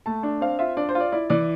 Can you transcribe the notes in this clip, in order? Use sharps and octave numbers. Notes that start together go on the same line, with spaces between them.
A3 A5
D4
C4 F5
F4 E5
D4 D5
C5
F4
D5
E4 D5
E3 D5